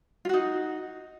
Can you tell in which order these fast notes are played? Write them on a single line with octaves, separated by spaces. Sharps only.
F4 F#4 D#4